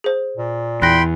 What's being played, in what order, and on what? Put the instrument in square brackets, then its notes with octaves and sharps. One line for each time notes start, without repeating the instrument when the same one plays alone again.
[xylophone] G#4 C5
[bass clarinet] A#2
[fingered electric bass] E2 [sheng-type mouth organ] G5 B5 C6 [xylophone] F#6 A#6